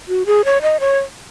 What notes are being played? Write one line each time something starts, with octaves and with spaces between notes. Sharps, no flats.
F#4
G#4
C#5
D#5
C#5